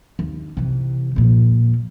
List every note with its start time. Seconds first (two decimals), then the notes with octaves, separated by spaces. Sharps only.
0.19 D#2
0.57 C3 E3
1.16 A#2 F3